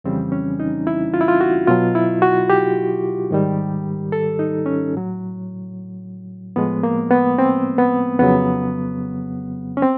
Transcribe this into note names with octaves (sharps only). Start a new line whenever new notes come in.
F2 C#3 E3 G3 C4
C#4
D#4
E4
F4
E4
F4
F#4
B2 F#3 F4
E4
F#4
G4
G#2 D#3 G3
A4
D#4
C#4
A2 F#3
A2 F3 G#3 B3
A#3
B3
C4
B3
F2 C#3 F#3 B3
C#4
C4